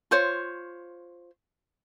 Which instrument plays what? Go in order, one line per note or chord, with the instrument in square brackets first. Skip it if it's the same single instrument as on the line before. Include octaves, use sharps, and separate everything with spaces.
[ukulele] F4 C5 C#5